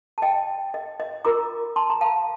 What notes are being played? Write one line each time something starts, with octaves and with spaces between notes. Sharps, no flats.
A5
D#5 G5
D#5
D#5
F4 A#4 A#5 D6
A5 C6
A#5
F5 A5